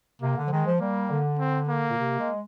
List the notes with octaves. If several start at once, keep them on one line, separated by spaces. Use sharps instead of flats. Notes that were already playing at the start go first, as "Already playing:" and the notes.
C3 A#3
D3
F3
D#3 G#3
F3
G3 A#3
D3
C4
A#3
A#2
C3
G#3